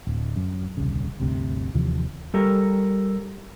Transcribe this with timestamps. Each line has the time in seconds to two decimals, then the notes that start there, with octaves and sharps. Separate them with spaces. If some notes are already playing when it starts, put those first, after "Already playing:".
0.07 D1
0.36 F#2
0.77 D#1 C2 C#3
1.20 G1 D2 C3
1.74 D#2 C3 E3 F3
2.34 G3 A4 A#4